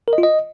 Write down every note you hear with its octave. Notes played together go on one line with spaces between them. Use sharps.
A#4
D#5
F4
D#5